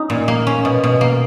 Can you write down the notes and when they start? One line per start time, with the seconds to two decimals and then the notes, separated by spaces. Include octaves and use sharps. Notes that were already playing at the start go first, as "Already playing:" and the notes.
Already playing: C#4 D#4
0.10 A#2
0.28 A#3
0.47 C#4
0.65 B2
0.84 B2
1.01 A#3